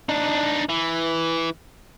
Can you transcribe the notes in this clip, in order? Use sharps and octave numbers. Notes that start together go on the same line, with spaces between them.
D4 D#4
E3